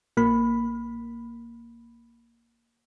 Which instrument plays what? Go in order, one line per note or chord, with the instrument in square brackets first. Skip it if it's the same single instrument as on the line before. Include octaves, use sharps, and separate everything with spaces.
[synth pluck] A#1 A#3 B5